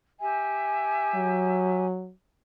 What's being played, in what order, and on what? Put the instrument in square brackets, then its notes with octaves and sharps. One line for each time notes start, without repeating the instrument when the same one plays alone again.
[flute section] G4 E5 G#5
[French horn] F#3